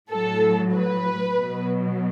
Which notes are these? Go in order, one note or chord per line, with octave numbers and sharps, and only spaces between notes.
A2 F#3 A4
B4
B2 F#3